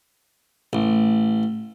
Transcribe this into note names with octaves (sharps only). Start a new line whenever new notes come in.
A1